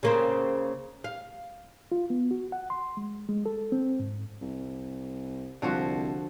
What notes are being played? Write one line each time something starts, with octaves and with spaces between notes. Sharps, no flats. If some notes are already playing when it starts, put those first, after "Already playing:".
C#3 A#3 C4
F5
F4
B3
F#4
F#5
C6
G#3
G#3
A4
C4
G#2
C2
C2 D3 F3 F#4